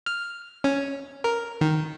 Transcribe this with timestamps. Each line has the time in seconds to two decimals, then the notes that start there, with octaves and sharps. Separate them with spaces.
0.06 F6
0.64 C#4
1.24 A#4
1.61 D#3